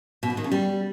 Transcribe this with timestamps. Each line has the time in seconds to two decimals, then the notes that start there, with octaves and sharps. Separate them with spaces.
0.23 B2
0.30 G#2
0.37 D#3
0.44 C#3
0.52 G3